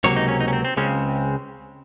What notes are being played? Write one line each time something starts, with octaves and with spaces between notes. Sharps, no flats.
C#2 C3 F#3 A#3 C#5
D#4
C#4
D#4
C#4
C4
C4
C#2 C#3 G#3 C4 C#4